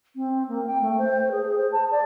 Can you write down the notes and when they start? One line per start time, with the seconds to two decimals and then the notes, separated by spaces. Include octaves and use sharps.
0.16 C4
0.48 A#3
0.67 G5
0.82 A3
0.98 C5
1.31 G#4
1.57 C5
1.72 A5
1.91 D5